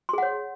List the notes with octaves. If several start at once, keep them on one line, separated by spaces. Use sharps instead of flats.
G#4 C#5 F#5 C6